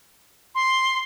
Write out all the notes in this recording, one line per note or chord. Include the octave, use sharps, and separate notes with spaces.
C6